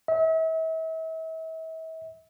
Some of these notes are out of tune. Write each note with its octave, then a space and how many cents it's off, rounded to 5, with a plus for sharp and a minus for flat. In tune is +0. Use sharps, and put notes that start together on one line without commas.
E5 -40